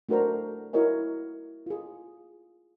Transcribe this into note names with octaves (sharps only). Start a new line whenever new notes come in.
A3 D4 F#4 A#4 C5 A#5
E4 F#4 A#4 C#5 D#5 G#5
F4 G#4